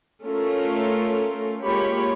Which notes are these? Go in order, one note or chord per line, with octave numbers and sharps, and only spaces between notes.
A3 C#4 F4 A#4
G#3 A#3 F4 G4 C#5 B5